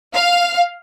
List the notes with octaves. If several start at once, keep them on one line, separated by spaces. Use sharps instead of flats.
F5